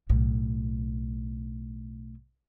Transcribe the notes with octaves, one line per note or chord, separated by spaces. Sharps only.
B1 A2